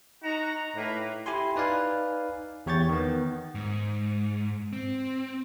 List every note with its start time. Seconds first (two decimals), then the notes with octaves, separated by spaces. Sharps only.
0.23 D#4 F#4 A#5
0.75 A2 A#3 B4
1.26 E4 G4 G#5 C6
1.56 D#4 B4 D5 F5 G#5
2.66 E2 G4 C#5 C#6 G6 A6
2.89 D#3 B3
3.55 G#2
4.73 C4